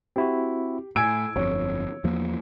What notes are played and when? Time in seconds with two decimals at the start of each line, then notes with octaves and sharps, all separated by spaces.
0.16 C4 E4 F#4 G4
0.96 A2 G#5 E6 G#6 D7
1.36 G1 F2 C#5
2.04 E2 F3 A#3